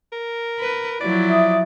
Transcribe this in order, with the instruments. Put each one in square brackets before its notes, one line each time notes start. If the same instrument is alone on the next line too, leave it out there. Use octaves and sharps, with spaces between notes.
[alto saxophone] A#4
[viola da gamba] B4
[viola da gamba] F3 F#3 E4 [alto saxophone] D5
[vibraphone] E5 D#6